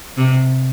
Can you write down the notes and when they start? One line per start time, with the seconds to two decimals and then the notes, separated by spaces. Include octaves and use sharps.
0.17 C3